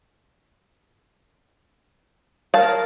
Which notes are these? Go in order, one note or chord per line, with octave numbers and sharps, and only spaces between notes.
A#4 F5 A5